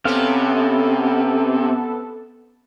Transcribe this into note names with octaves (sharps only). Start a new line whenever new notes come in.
C3 B3 C#4 A4 F5